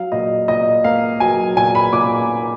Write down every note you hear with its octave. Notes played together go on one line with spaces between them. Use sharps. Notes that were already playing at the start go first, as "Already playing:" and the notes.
Already playing: F#3 F5
A#2 D#5
A#2 D#5
A#3 F5
F#3 G#5
A#2 G#5
B5
A#2 D6